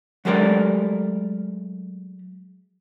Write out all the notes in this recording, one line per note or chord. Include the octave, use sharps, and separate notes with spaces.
F#3 G#3 A3 G4 A#4 D5